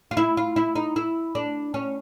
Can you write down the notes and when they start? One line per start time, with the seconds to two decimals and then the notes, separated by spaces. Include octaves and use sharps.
0.11 F4
0.17 E4
0.37 F4
0.56 E4
0.75 D#4
0.96 E4
1.35 D4
1.74 C#4